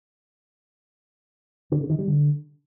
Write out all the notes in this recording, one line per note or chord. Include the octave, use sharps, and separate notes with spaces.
D3
C#3
D#3
G3
D3